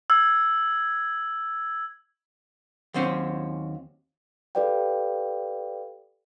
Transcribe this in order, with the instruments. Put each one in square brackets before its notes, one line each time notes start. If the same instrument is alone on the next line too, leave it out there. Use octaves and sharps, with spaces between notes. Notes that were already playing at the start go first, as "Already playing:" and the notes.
[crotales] E6 G#6
[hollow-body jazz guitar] D#2 F#3 C4 C#4
[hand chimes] G4 A4 B4 D5 F5 G5